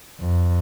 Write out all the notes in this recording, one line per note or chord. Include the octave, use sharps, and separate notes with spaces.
F2